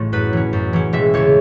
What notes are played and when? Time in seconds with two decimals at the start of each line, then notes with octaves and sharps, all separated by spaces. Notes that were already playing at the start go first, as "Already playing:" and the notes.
Already playing: A1 A2 A3
0.12 F#2 B4
0.33 E3 C#4
0.53 F#2
0.73 E3 C#4
0.93 E1 E5
1.14 E2 C#3 C#5